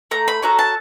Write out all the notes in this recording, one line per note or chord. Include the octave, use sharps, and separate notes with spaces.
A3 A#5
B5
C#4 F#4 A4 A#5
A5